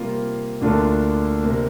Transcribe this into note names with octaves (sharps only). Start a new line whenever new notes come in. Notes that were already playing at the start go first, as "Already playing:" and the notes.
Already playing: C3 G3 A#3 F4
D2 D3 A#3 D4 F4
C3 A#3